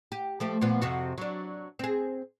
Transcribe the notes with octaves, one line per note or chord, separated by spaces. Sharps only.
G4
F3 A3 G4
A#2 F3 B3
F2 C3 F#4
F#3 D4
C4 G#4